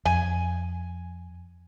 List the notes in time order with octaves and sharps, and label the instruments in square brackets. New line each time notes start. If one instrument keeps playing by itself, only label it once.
[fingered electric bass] F2 [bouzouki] G#5